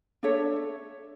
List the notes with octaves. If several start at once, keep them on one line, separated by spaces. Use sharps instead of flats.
D4 A4 C#5 E5